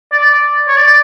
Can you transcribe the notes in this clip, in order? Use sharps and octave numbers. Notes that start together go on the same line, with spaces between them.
D5
D5
C#5
D5
D5